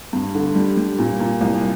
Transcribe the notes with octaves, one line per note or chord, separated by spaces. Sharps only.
G2
D3
G3
G3
A#2
A#2
C2